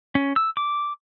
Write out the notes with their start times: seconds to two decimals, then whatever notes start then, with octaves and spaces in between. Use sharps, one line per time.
0.15 C#4
0.36 E6
0.57 D6